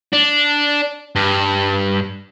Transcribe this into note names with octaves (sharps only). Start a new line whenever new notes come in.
D4
G2